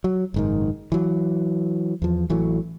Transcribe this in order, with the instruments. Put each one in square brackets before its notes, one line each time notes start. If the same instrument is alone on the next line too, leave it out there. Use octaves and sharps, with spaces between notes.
[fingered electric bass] F#3
F#1 G#2 D#3
E3 F#3
E2 F3
A1 E3 F#3 A3